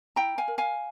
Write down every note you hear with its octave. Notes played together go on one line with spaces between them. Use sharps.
E4 G5 A#5
F5 G#5
A#4
F5 G#5